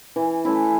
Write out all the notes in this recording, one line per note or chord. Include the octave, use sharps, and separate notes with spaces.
E3
A3 C#4 E4